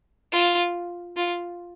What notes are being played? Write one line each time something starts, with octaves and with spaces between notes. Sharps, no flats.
F4
F4